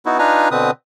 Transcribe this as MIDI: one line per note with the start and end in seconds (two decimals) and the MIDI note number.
0.06 0.18 59
0.06 0.18 63
0.06 0.18 64
0.06 0.18 66
0.18 0.49 62
0.18 0.49 63
0.18 0.49 65
0.18 0.49 71
0.18 0.49 80
0.18 0.49 82
0.51 0.71 47
0.51 0.71 50
0.51 0.71 60
0.51 0.71 71
0.51 0.71 87